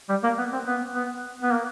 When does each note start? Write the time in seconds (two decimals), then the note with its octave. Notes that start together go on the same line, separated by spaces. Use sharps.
0.09 G3
0.23 A#3
0.38 B3
0.52 C4
0.67 B3
0.95 B3
1.43 B3
1.53 A#3